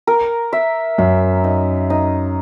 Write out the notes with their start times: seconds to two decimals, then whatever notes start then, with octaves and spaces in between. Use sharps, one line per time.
0.07 A#4
0.53 E5
0.98 F#2 E5
1.44 D#4
1.90 D#4